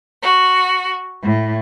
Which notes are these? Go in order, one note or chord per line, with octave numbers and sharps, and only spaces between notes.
F#4
A2